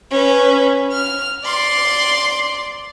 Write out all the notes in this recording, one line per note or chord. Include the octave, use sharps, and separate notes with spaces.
C#4 B4
F6
D5 C6